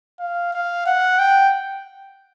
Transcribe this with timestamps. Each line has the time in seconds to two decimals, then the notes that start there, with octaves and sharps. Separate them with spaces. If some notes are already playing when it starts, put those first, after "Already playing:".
0.19 F5
0.53 F5
0.86 F#5
1.19 G5